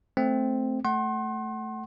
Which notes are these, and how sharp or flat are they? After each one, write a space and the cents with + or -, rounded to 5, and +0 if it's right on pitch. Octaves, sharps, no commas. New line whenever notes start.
A3 +0 C4 +0
A3 +0 F#5 +25 C6 +35